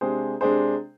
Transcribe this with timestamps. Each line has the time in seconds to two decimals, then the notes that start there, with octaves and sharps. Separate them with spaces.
0.01 C3 G#3 D4 G#4 C5
0.41 C3 G#3 D4 G#4 C5